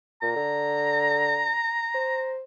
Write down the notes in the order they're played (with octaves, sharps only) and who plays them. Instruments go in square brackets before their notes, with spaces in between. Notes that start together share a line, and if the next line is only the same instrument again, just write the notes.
[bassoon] A#2 [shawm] A#5
[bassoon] D3
C5